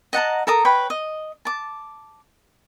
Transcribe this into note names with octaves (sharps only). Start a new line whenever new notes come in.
D#5 F#5 A5 A#5
A4 A#4 A#5 D#6
B4 C#5 G5 B5
D#5
A5 D6